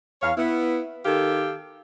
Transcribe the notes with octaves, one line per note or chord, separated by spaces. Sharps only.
E2 C#5 F5
B3 E4
D#3 G4 A4 F5